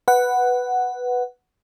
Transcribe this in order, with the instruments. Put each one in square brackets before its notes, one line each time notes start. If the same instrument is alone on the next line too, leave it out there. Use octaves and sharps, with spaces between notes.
[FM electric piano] B4 F#5